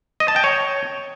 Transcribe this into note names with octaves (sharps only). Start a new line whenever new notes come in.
D#5
A5
G5
C#5